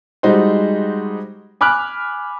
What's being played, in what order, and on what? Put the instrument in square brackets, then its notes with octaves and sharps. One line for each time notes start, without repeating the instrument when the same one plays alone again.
[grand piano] G3 G#3 D#4 F#4 C5
G#5 B5 D6 F6 F#6